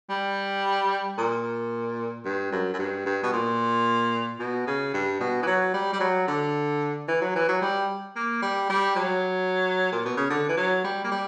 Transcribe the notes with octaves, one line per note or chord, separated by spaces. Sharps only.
G3
A#2
G2
F#2
F#2
G2
G2
B2
A#2
B2
C#3
G2
B2
E3
F#3
G3
G3
F#3
D3
E3
F#3
E3
F#3
G3
A#3
G3
G3
F#3
A#2
B2
C#3
D3
E3
F#3
G3
A#3
G3